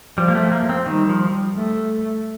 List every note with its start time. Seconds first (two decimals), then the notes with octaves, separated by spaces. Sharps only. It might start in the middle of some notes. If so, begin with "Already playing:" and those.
0.17 F3 G3
0.28 A#3
0.35 A3
0.52 A#3
0.69 C4
0.86 D#3 G3
1.09 F3
1.55 A3